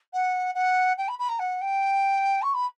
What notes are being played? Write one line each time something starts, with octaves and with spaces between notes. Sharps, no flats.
F#5
F#5
G5
B5
B5
A#5
F#5
G5
C#6
B5